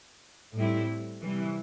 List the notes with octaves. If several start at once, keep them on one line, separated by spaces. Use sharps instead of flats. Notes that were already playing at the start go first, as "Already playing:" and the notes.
A2 G3 C4 E4
C3 E3 G3